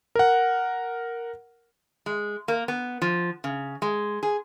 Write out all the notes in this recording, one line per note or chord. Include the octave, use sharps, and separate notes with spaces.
A#4 F#5
G#3
A#3
B3
F3
C#3
G#3
G#4